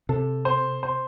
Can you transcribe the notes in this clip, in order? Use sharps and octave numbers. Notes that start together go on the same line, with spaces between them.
C3 A4
C5
C5